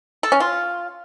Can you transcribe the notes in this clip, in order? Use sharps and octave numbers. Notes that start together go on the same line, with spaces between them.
A4
C#4
F4